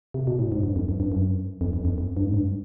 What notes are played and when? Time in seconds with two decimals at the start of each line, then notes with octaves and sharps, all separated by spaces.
0.14 C3
0.27 B2
0.39 A2
0.52 G#2
0.63 G2
0.76 F2
0.89 F#2
1.00 G2
1.12 F#2
1.61 F2
1.73 F2
1.85 F2
1.98 F2
2.17 G2
2.25 G#2
2.34 G2